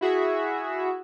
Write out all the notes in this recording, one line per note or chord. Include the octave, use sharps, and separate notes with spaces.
E4 F#4 G#4 E5